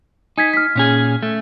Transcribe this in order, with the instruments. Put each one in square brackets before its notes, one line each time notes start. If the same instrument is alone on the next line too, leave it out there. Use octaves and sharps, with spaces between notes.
[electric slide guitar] D#4 [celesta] G#5 G#6 B6
[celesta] F6 B6
[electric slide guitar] A#2 C#4 G#4
A3